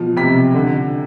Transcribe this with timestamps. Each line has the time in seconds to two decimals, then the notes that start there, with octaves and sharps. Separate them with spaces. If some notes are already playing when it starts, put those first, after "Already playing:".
Already playing: B2 F3
0.17 C3 B6
0.54 D3